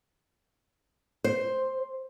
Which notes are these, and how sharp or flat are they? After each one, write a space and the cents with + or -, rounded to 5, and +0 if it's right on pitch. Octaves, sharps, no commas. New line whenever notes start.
C5 +5